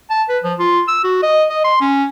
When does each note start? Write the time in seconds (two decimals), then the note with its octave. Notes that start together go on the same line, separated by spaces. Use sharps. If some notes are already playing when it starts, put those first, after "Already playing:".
0.10 A5
0.29 B4
0.44 F3
0.59 F4
0.88 E6
1.04 F#4
1.23 D#5
1.49 D#5
1.64 C6
1.81 C#4